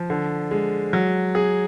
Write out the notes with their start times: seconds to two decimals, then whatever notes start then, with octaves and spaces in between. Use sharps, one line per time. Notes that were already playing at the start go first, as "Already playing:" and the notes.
Already playing: F3
0.10 D3
0.51 G#3
0.93 F#3
1.35 G#4